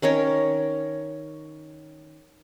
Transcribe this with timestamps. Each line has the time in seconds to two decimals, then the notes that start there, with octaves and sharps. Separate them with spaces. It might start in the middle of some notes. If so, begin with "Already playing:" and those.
0.02 D#3 C#4 A#4 C#5